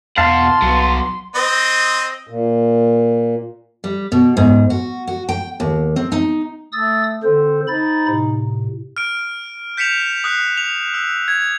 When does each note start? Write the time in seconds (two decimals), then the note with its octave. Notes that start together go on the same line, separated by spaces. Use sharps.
0.18 E2 B2 F5 F#5 A5 C6
0.62 C2 F#3 B3
1.35 C4 D#5
2.27 A#2
3.84 G3
4.12 B2
4.37 G#2
4.70 F#4
5.07 F#4
5.29 G5
5.60 D#2
5.96 C4
6.12 D#4
6.72 A3 D#6 E6 A6
7.23 D3 C4 A4 C5
7.68 D#4 C5 B5 A6
8.07 A2 C3
8.97 F6 D7
9.77 G6 B6 C#7 E7 F7
10.24 D#6 F#6 C7
10.57 F7
10.94 E6
11.28 G#6